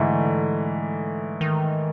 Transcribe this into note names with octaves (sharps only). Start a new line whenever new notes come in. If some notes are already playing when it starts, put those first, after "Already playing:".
Already playing: G#2 D3 E3 A3
D#3